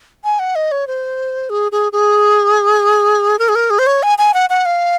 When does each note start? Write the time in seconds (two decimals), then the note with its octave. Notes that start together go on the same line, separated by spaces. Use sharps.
0.24 G#5
0.39 F#5
0.55 D#5
0.72 C#5
0.87 C5
1.50 G#4
1.72 G#4
1.92 G#4
3.39 A#4
3.49 G#4
3.55 A#4
3.70 G#4
3.79 C5
3.87 C#5
4.03 G#5
4.18 G#5
4.34 F#5
4.50 F#5
4.65 F5